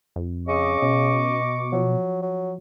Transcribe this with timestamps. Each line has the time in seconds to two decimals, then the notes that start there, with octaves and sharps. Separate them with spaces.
0.16 F2
0.48 C#3 D#5 C#6 D6
0.82 B2 C#4
1.73 F3 F#3
2.22 F#3